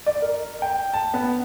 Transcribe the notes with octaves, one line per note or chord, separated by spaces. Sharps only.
D5
A#4
G5
A5
B3